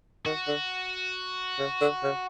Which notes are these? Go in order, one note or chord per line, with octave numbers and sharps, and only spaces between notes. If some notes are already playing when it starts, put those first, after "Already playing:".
D#3 F#4
D3
C#3
D3
C#3